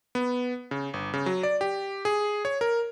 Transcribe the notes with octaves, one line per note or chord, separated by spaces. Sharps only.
B3
C#3
G1
C#3
F#3
D5
G4
G#4
C#5
A#4